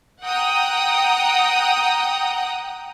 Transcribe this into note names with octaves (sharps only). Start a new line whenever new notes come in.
F#5 G5 A#5 D#6